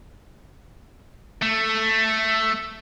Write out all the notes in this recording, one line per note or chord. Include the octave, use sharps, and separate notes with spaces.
A3